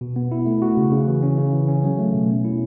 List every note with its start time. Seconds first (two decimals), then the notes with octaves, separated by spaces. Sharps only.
0.01 B2
0.16 B3
0.32 E4
0.46 A3
0.62 F#4
0.77 C#3
0.92 C#3
1.07 E3
1.23 C#4
1.38 C#3
1.53 E3
1.68 C#4
1.84 F#3
1.99 A3
2.14 B2
2.29 B3
2.45 E4